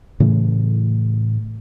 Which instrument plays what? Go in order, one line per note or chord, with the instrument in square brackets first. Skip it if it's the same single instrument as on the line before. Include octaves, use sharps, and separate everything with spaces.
[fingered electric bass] A2 C#3 E3 A3